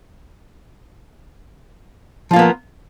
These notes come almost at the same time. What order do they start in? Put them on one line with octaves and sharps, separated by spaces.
F3 F4 A#3 B3 A#4